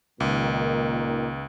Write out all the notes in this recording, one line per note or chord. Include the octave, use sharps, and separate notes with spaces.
C#2 A#2 D#3